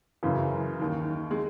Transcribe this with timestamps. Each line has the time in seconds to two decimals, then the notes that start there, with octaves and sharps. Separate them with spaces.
0.23 F#2 C#3 E3
0.80 D#2 D#3
1.31 G#3